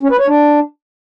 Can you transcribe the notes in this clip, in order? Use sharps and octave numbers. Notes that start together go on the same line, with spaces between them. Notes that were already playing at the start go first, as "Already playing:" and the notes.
C#4
B4
C#5
D4